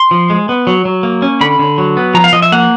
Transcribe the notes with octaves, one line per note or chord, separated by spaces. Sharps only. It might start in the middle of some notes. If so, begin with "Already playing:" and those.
Already playing: C6
F3
G#3
B3
F#3
F#3
A#3
C#4
D3 B5
D3
F#3
B3
F3 A#5
F5
F3 D#5
E5
A#3 F#5